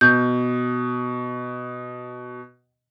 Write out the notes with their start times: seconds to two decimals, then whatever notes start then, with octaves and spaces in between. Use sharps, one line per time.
0.01 B2 G6